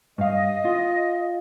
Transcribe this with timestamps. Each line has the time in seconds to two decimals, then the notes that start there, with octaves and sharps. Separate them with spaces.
0.18 G2 D#5 F5
0.65 F4